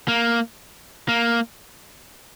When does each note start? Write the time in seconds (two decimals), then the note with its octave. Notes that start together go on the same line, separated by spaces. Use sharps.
0.08 A#3
1.09 A#3